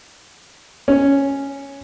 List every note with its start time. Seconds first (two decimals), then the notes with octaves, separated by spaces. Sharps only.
0.88 C#4